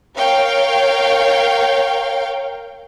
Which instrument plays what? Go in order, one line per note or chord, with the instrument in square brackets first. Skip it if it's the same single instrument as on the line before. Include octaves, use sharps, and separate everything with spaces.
[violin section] A#4 C#5 F5 G5